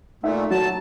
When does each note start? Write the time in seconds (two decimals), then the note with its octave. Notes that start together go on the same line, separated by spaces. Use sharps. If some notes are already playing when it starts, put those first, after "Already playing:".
0.23 A#2 A3 D#4 E5
0.51 F#3 A5